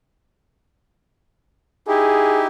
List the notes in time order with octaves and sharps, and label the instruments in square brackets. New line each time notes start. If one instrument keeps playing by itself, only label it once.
[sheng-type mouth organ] D#4 E4 G4 [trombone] G#4